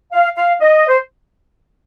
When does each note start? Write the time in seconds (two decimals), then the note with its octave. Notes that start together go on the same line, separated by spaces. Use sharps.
0.13 F5
0.37 F5
0.60 D#5
0.87 C5